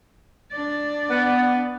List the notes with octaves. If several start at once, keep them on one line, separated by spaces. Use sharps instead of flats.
D4 D5
B3